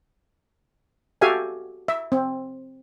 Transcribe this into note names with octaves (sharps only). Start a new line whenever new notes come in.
F#4 G4 A4 E5 F5 G#5
E5
C4